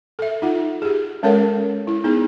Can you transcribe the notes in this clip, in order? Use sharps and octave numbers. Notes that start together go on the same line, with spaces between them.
A4 E5
D#4 F4 F#5
G4 G#4
G#3 C#4 A4 A#4 C#5 F#5
E4
B3 D#4 G#4